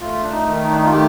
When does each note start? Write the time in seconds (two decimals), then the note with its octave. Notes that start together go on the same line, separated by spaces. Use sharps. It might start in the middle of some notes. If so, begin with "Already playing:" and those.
0.01 A3 F4
0.23 D4
0.31 D#4
0.47 D#3
0.63 D#4
0.70 D4
0.78 D#4
0.85 F4
0.92 A3 G4